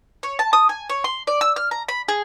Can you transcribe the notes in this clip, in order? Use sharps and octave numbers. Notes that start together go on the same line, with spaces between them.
C#5
A5
D#6
G#5
C#5
C6
D5
E6
F6
A#5
B5
G#4